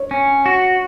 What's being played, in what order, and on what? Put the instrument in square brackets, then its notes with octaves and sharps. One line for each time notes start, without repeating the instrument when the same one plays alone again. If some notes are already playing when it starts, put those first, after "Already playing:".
Already playing: [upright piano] C#5
[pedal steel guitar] C#4
F#4